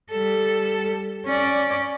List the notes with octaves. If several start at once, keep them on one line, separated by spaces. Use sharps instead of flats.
G3 A4
C#4 D5